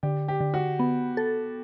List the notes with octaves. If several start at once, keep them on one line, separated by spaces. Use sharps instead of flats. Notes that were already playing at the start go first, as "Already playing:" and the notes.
D3 G4
G4
D3
F#4
B3
A4